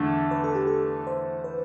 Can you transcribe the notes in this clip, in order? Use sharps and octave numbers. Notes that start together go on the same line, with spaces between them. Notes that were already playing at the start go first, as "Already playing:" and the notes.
Already playing: E2 D3 A3
B4
A4
G4
A4
C5
B4